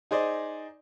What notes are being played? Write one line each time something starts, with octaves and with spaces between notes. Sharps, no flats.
D#4 G#4 C5 D5 D#5